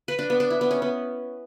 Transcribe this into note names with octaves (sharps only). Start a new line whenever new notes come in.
B4
D4
B3
D4
E4
B3
C#4
B3